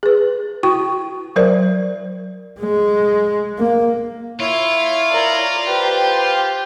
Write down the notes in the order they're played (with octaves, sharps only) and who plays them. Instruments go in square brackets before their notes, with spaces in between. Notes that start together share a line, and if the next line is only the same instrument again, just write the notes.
[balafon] G#4 B4
E4 F#4 G5 C#6
F#3 A#4 C5 D5
[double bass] G#3
A#3
[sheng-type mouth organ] E4 C#5 [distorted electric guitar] F4
[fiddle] A#4 D5
[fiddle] G4 C5 [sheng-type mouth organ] B4